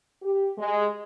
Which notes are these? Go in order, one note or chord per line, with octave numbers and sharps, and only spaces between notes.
G4
G#3